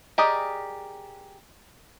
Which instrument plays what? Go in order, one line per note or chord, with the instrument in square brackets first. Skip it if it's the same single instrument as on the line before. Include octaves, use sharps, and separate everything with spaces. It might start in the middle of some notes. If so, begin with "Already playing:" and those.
[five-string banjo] G4 G#4 A#4 D5 D#5